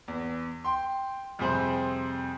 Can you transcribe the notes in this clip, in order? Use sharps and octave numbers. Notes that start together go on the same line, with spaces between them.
E2
G5 C6
F2 C3 G3 G#4 C5